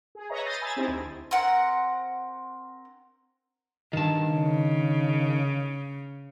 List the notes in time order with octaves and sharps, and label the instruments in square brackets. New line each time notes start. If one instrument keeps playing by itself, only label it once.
[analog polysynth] G#4
B4 C#5 D#5 E5 A#5
D#6 G6 A6 A#6 C7 D#7
G#5 A#5 B5 E6 G#6 A6
C4 D#4 E4 G4 C5
D2
[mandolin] C4 A#4 F#5
[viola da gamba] G2 [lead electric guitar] D#3 A5
[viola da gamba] C#3